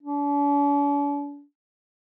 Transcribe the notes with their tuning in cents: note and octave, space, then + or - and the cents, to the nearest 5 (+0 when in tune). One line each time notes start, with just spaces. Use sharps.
D4 -45